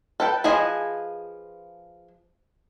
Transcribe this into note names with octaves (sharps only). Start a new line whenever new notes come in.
A4 B4 G5
F3 G#4 B4 D#5 G#5